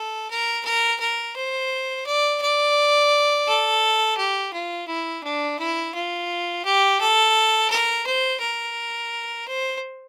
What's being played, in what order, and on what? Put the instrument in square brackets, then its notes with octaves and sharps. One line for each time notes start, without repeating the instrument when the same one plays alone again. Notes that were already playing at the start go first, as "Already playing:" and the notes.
Already playing: [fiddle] A4
A#4
A#4
A#4
C5
D5
D5
A4
G4
F4
E4
D4
E4
F4
G4
A4
A#4
C5
A#4
C5